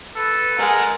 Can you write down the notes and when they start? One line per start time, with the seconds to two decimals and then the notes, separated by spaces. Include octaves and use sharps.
0.16 A4 B4
0.58 G#3 A#4 F#5 G#5